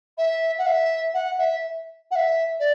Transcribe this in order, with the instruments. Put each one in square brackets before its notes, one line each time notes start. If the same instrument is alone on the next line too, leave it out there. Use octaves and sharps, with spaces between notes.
[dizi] E5
F#5
E5
F#5
E5
F#5
E5
D5